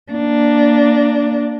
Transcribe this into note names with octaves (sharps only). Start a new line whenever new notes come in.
A#3 D4